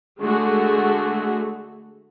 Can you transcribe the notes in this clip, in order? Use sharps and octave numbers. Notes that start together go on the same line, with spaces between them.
D3 G#3 A3 F#4 G#4